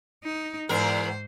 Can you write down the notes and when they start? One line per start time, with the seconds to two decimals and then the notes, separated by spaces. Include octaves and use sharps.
0.24 D#4
0.69 E2 G#2 A#4 C5